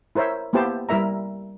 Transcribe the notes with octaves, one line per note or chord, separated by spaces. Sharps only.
E4 A#4 C5 C#5 E5
A#3 B3 E4 G4 C5 A5
G3 E4 A#4 E5 A#5